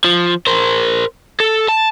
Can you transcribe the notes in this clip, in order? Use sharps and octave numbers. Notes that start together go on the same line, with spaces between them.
F3
A#4 C5
A4
A5